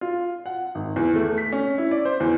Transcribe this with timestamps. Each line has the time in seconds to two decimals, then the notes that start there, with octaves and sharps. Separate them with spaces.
0.01 F4
0.46 F#5
0.75 G#1
0.96 E2
1.16 A3
1.38 B6
1.53 C#4
1.78 E4
1.91 D5
2.05 C5
2.20 E2